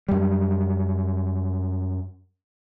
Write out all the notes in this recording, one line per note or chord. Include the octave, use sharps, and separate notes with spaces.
F#2 G3